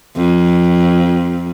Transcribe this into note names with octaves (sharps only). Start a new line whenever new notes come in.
F2